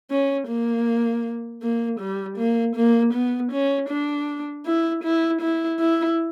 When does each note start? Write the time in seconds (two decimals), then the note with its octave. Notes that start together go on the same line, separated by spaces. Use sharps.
0.10 C#4
0.48 A#3
1.62 A#3
2.00 G3
2.38 A#3
2.76 A#3
3.14 B3
3.52 C#4
3.89 D4
4.66 E4
5.04 E4
5.42 E4
5.80 E4